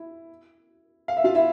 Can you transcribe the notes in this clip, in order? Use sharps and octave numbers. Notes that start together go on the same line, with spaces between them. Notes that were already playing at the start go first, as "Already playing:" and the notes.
Already playing: E4
F5
E5
F4 F5
E4 E5